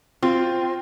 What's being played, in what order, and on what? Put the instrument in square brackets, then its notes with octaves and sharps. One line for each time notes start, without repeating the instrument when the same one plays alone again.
[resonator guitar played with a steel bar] C4 [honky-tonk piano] F4